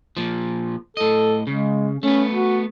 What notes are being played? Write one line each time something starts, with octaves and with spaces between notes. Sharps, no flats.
A#2 F3
A2 A4 D#5
C#3 G#3
A3 B3 C#4
F#4